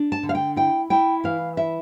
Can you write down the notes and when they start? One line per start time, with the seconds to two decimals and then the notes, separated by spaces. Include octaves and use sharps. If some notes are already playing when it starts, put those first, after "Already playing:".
Already playing: D4
0.12 A5
0.23 D3
0.29 F5
0.35 G5
0.56 E4 G5
0.90 E4 G5
1.24 E3 F5
1.57 E4 E5